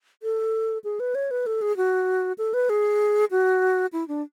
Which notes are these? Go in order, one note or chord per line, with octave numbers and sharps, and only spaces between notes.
A4
G#4
B4
C#5
B4
A4
G#4
F#4
A4
B4
G#4
F#4
E4
D4